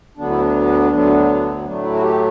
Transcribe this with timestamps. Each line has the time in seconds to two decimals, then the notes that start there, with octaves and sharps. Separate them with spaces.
0.17 D2 D3 F#3 B3 D4
0.29 E4
0.40 D4
0.92 D2 D3 F#3 B3
1.65 A2 F#3 A3 D4
1.83 E4
1.94 F#4
2.02 G4